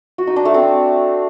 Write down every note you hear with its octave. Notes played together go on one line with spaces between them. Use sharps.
F#4
D#4
D4
A3
C4